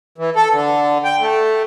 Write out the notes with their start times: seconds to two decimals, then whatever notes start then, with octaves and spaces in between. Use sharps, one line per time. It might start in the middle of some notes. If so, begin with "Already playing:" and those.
0.18 E3
0.36 A4
0.52 D3
1.04 G5
1.21 A3